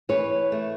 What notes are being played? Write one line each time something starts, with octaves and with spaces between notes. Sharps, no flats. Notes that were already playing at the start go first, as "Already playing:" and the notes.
E3 B4 C#5
A3